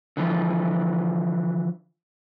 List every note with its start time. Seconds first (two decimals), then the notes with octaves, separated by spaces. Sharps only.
0.17 D3 E3 F3